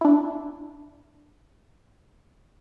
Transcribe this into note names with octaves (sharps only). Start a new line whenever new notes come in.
D4 E4